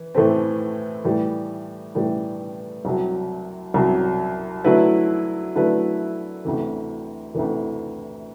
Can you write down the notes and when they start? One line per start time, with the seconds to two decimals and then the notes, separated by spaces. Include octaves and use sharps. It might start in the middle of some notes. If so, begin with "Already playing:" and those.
Already playing: E3
0.15 A2 E3 A3 C4
1.04 A2 E3 G3
1.95 A2 E3 G3
2.85 C2 C3 F#3
3.74 C2 C3 F#3
4.64 D3 F#3 A3 E4 B4
5.55 D3 F#3 A3 E4 B4
6.45 D2 C3 E3
7.35 D2 C3 E3